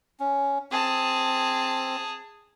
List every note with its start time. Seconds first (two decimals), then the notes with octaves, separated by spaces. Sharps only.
0.20 C#4
0.72 C4 G#4 A5